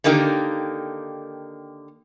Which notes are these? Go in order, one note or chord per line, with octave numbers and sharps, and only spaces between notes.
D3 D#3 A#3 D#4 G4